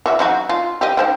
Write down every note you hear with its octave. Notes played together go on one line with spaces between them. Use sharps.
E3 F#4 E5
F#3 D#4 F#4
F4
G4 D#5
D#4 C5 G5